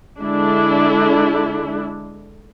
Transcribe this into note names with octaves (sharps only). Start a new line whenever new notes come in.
D3 G#3 D4 E4